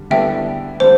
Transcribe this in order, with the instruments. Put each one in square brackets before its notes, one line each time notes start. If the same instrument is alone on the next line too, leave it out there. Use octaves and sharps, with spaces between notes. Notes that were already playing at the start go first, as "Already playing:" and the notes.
Already playing: [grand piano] D3 G3
[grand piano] D3 G3 B3 E4 A4 [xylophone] E5 G5
[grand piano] D3 G3 [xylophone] C5